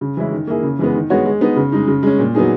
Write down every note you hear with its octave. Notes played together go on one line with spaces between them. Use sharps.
C#3
E3 G#3 C#4 E4
D#3
A#3 E4 G#4
C#3
E3 G#3 B3
D#3
G#3 B3 F#4 C#5
G#3
B3 D#4
C#3
G#3 D#4
C#3
G#3 C#4
A#2
F#3 B3 D#4 G#4